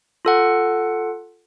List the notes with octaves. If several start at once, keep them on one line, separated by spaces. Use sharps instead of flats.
F4 A4 F#5